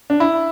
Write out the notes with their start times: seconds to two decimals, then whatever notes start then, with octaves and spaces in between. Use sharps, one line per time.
0.10 D4
0.20 E4